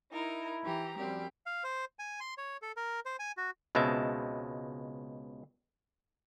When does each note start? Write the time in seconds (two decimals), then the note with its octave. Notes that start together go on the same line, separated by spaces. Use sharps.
0.13 D#4 E4 A#4
0.64 E3 G4 A#5
0.97 F#2 F3 G3 C4 G4
1.46 F5
1.64 C5
1.99 G#5
2.20 C6
2.38 C#5
2.62 A4
2.77 A#4
3.06 C5
3.19 G#5
3.37 F#4
3.75 C#2 B2 G#3 C4 E5 A5